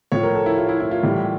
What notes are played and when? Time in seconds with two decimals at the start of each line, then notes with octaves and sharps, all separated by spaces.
0.12 A2 F3 C#5
0.23 A#4
0.35 A4
0.46 E4
0.58 F4
0.69 E4
0.80 E4
0.91 F4
1.03 A2 E3 G3